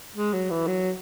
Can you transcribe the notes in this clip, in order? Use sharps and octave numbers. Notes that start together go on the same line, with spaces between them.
G#3
F#3
E3
F#3